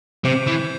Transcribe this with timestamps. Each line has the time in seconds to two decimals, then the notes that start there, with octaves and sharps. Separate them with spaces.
0.25 C3 C5
0.47 E3